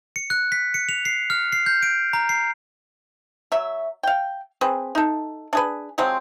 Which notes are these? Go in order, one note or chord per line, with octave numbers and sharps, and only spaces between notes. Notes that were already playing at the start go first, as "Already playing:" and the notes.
C#7
F#6
B6
C#7
F7
C7
F6
C7
G6
D7
A#5
C7
F#3 E5
F5 G5
C4 G#4 B4
D#4 A4
D4 G#4 B4
F3 F#3 G#3 C4